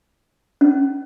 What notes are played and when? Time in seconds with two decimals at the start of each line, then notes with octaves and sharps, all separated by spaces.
0.61 C#4